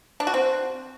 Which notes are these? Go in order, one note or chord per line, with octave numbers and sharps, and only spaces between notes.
D4
F#4
C4